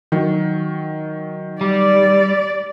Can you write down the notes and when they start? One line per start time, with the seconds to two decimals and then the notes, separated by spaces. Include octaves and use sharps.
0.12 D#3 F#3
1.61 G3 D5